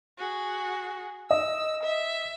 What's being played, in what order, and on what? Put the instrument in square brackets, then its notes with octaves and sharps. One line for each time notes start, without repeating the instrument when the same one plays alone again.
[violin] F#4 G#4
[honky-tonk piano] D#5 [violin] E6
[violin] E5